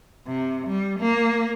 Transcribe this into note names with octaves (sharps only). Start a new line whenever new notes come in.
C3
G3
A#3